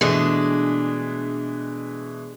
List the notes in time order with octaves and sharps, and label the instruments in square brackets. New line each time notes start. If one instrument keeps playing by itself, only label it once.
[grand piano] B2 E3 A3 [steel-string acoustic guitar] G#3 D4